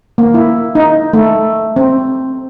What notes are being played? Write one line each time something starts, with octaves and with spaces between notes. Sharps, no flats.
A#3
E4
D#4
A3
C4